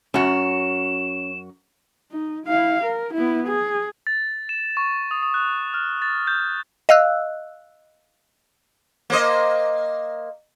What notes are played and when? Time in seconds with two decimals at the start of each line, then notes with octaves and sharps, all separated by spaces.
0.14 F#2 C#4 F#4 E7
2.11 D#4
2.46 E4 F5
2.84 A#4
3.14 B3 E4
3.48 G#4
4.07 A6
4.49 E7
4.77 C#6
5.11 D#6
5.23 D#6
5.34 F#6
5.74 F6
6.02 A6
6.27 G6
6.89 D#5 F5 E6 F#6
9.10 A#3 C5 D#5